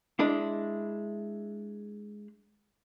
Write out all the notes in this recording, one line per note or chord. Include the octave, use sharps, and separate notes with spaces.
G#3 D4 E4